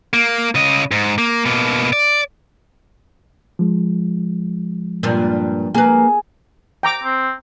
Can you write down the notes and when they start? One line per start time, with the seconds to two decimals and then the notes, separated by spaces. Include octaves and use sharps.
0.13 A#3
0.55 C#3 D#5
0.91 G#2
1.18 A#3
1.45 B2 A#3
1.93 D5
3.59 F3 G#3
5.03 G2 A#2
5.74 A#3 G#4 B4
6.83 G5 A#5 D6
7.04 C4